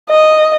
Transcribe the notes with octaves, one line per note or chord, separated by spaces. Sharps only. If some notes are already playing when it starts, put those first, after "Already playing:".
D#5